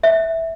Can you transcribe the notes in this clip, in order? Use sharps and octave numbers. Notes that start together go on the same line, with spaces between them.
E5